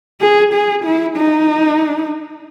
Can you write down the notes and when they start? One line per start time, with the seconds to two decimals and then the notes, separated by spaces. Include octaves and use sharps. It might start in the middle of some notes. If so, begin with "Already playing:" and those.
0.21 G#4
0.53 G#4
0.84 E4
1.17 D#4